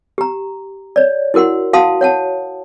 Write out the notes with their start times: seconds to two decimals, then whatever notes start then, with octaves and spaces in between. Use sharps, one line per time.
0.18 G4 A#5
0.96 C#5 D5
1.34 E4 F#4 A#4 F#5 C6
1.73 F#4 F5 F#5 A5 C6 D#6
2.01 C#5 F#5 A5